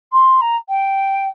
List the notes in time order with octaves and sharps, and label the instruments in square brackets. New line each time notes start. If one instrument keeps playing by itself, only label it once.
[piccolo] C6
A#5
G5